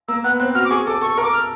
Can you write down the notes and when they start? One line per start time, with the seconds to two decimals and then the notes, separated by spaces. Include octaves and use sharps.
0.08 A#3 E6
0.24 B3 F#6
0.39 C4 F#6
0.55 F#4 F6
0.65 D6
0.70 G#4 C#6
0.87 A4 D6
1.01 A4 C#6
1.13 C#6
1.18 A#4
1.23 D6
1.33 F6